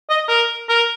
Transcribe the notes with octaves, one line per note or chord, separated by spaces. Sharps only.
D#5
A#4
A#4